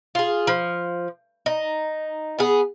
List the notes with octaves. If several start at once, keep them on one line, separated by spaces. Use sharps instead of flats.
F4 G#4
F3
D#4
B3 G#4